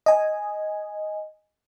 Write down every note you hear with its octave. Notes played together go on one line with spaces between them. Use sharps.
D#5 G#5